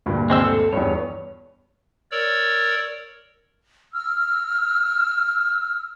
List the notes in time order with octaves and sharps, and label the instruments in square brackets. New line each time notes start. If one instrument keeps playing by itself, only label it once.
[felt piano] D2 G2 A#2
[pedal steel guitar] G#3 C4 E6
A4
[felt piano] E2 G2 [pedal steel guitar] C#5
[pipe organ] A#4 C#5 D5 E6
[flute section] E6 F6